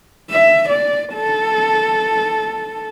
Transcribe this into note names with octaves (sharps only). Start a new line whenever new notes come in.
E5
D5
A4